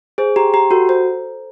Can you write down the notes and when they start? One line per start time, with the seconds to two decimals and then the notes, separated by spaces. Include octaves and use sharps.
0.18 G#4 C5
0.36 G4 A#5
0.54 G4 A#5
0.71 F#4 A4
0.89 C5